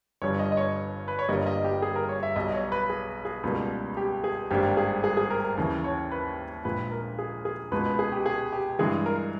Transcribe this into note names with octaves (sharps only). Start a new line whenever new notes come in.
G1 G2 G3 C#5
D#5
D#5
C#5
B4
C#5
G1 G2 G3 A#3 D#5
D#5
G4
G#4
A#4
C#5
E5
B1 B2 G3 D#5
C#5
B4
G#4
G#4
C#2 B2 G3 A#3
G4
G#4
G#1 G2 G3 A#3 G4
G#4
G#4
G#4
A#4
A#4
D#2 C#3 E3
C#5
B4
A#1 A#2 G#3 B4
A#4
G#4
G#4
C#2 B2 G#3 B4
B4
G#4
G4
G#4
G4
G2 E3 G#3 G#4
A#4